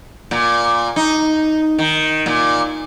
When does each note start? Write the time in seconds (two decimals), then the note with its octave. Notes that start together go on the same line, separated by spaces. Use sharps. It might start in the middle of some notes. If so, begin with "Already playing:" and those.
0.31 A#2
0.96 D#4
1.78 D#3
2.26 A#2